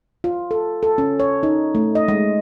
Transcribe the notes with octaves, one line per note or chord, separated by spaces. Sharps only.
F4
A4
A4
C#4
C#5
D#4
A3
D#5
G#3